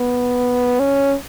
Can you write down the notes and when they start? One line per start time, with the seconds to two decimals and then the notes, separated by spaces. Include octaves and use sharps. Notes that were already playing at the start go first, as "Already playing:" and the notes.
Already playing: B3
0.79 C#4